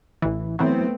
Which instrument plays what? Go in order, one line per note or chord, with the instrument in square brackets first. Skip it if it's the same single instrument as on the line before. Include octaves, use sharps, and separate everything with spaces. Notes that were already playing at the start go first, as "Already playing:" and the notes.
[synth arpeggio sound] A1 E3
[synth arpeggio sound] E3 F#3 [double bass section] A3 B3 C4